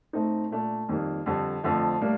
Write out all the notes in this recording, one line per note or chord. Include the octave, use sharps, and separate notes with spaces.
A2 A3 C4 D#4
A#2 A3 D4
F2 D#3 G3 A#3
F2 D3 G3
F2 D3 F3 A3
A2 G3 A#3 D4